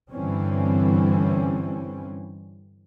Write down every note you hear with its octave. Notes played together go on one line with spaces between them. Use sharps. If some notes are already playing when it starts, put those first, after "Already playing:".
G2 D3 E3 G3 C4 C#4